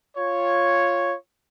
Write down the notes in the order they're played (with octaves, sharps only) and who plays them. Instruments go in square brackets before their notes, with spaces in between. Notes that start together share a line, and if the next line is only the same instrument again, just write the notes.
[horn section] F4 C#5